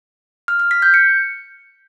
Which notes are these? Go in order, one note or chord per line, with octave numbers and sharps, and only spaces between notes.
F6
F6
B6
G6
C#7